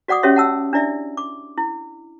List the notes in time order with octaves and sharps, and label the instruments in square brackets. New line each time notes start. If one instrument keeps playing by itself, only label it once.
[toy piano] F#4 D5 F#5 D6 D#6
C#4 F#4 G4 C#5 E5 C6
F#5 A5 E6
D4 E4 D5 E5
D6
E4